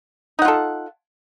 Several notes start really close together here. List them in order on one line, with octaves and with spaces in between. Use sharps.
D#4 F#5 F4 A4